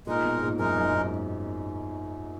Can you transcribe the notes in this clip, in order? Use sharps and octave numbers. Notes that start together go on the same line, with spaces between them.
A#2 G#3 D#4 A#4
B2
G#2
A#2
F#2 G#3 D#4 A#4
F#2
G#2